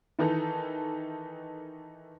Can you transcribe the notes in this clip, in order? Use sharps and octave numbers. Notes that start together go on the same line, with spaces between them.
D#3 E3 D#4 A4